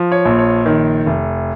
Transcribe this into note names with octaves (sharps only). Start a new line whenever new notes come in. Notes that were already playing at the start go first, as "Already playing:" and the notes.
Already playing: F3
C#5
A#1
C#5
D#3
F1